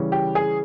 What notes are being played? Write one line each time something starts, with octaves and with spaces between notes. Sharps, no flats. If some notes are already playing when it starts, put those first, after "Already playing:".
Already playing: C#3 E3 G3 C#4
G4
G#4